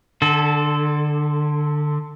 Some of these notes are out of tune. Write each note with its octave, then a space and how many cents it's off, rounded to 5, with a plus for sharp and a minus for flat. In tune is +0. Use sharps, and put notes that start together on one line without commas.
D3 +20 A4 -15